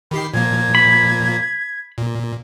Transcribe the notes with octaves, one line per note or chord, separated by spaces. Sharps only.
D#3 G4 B5 C7
A#2 F3 A#3 G#6
B5
A#2